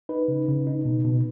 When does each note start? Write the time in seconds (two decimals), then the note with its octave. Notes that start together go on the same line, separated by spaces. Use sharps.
0.09 D#4 B4
0.28 C#3
0.48 C#3
0.67 D#4
0.85 B2
1.05 B2